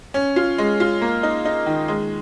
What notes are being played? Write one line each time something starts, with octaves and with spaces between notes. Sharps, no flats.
C#4
F4
G#3
F4
A#3
D#4
D#4
D#3
G#3